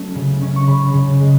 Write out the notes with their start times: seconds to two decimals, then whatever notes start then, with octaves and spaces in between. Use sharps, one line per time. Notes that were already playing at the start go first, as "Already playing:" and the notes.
Already playing: F#3 A3 C#4
0.15 C#3
0.42 C#4
0.56 C#6
0.67 C#3 B5
0.94 C#3
1.20 G#3